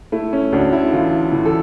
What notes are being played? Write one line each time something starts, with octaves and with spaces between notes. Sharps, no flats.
A3 E4
C#4
D2 D4
E4
E3 F4
E3
A4